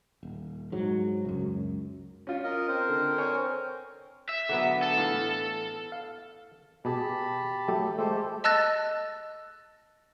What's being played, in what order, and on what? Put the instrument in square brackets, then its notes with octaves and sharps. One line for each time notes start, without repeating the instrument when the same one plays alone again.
[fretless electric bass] D#1
G#2 F#3
C#2 F#2
[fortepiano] C#4 F4
[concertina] A#4 D#5
C4 A#4 C5
[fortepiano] D3
C#5 G#5
[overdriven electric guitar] E5
[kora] D3 F#3 B3
[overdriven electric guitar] A4
[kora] A2 E3 F5
[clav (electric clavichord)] F5
[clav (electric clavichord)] B2 G#4 [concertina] G4 A5 B5
[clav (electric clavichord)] F#3 A3 G4 [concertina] A4
[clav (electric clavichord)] G#3 A3 [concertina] G4 A4 C5
[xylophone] D#5 A5 E6 F#6 A6 A#6